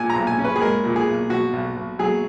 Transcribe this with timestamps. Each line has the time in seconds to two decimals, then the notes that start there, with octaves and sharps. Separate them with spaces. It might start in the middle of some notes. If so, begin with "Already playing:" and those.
Already playing: A#2 G#5
0.10 A#5
0.16 B1
0.27 G#5
0.39 C#4
0.45 B4
0.56 G#4
0.62 G#3 A#4
0.85 A#2
0.96 G#4
1.08 B1
1.30 B2 F#4
1.53 B1
1.76 B1
1.99 F#3 G#4